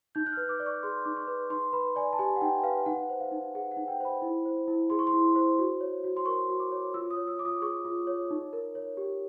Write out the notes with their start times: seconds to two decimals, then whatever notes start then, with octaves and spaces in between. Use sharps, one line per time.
0.15 D#4 G6
0.26 F#6
0.32 F6
0.37 B4
0.49 D6
0.60 D5
0.66 C#6
0.83 G#4 C6
1.05 D#4 D6
1.17 C#6
1.28 B4
1.50 D#4 C6
1.73 B4 B5
1.96 D5 G#5
2.13 A5
2.19 G4 G#5
2.36 F#5
2.41 D#4 G5
2.63 B4 F5
2.86 D#4 F#5
3.10 C5
3.20 F5
3.31 D#4
3.55 G#4 F#5
3.71 F#5
3.77 D#4
3.88 G5
4.00 C5 B5
4.22 E4
4.46 C5
4.68 E4
4.90 G#4 C6
4.99 C#6
5.07 C6
5.14 E4
5.36 C5
5.59 F#4
5.81 C#5
6.04 F#4
6.17 C6
6.26 A#4 C#6
6.49 F#4
6.60 D6
6.72 C#5
6.94 F4 E6
7.10 D#6
7.16 C#5
7.27 E6
7.39 F4 D6
7.45 D#6
7.62 G#4 C#6
7.85 F4
8.07 C#5
8.31 D#4
8.53 A#4
8.75 C#5
8.97 G4